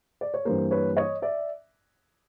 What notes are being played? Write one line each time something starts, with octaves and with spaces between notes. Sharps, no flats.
D5
C#5
G2 E3 G3 A#3 A#4 C5
B4 C#5
C#5 D#5
D5 E5